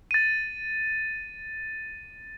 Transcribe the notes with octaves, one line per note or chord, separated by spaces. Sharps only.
A6 D#7